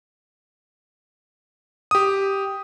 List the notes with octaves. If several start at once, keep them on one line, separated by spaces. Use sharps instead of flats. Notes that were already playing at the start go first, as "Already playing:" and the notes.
G4 D#6